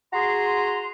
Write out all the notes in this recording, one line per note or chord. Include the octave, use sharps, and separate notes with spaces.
F#4 G#4 A#5 C6